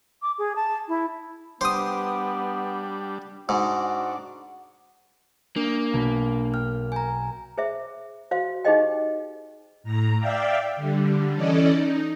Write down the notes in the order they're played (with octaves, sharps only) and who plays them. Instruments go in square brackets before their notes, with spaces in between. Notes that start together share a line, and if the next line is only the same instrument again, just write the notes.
[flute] D6
G#4
A5
E4
[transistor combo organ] G3 D4 [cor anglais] B3 [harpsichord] C5 D#6
[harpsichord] G#2 [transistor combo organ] D4 [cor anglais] F#4
[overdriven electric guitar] A#3 [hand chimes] D4
[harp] B1 B5 B6
[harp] G5 [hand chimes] F6
[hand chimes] G#5 A#5 [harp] G6
[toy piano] G#4 C5 E5
F#4 C5 F5
D#4 G4 G#4 C5 D#5 G5
[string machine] A2 A#5
D5 E5 F5 G5
D3 G3
E3 C#4 A4 D5 D#5
D#4